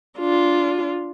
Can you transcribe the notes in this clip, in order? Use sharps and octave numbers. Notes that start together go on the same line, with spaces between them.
D4 F4